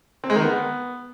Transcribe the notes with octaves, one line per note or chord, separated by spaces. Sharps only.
C4
G#3
D#3
B3